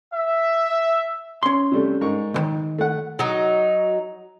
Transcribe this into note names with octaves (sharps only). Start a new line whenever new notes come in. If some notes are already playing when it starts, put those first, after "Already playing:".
E5
C#4 C6
C3 G3 A3
G#2 A#4 C#6
C#2 D#3
A3 F#5
F#3 D#4